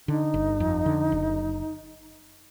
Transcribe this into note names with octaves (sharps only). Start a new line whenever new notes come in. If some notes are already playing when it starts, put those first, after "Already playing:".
D3 D#4
G1
F2
D3
F#1